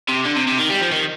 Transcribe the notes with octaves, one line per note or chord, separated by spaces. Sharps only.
C3
D3
C3
C3
D#3
G3
F3
D#3